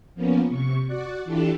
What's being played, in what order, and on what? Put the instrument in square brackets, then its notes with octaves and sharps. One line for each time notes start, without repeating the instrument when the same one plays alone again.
[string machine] F3 A#3 B3 C#4
C3 C#6
F#4 D5 F#5
E3 D4 E4 F4 G4 A4